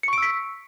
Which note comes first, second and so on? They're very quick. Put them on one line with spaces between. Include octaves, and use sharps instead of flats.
C#7 C#6 D7 E6 B6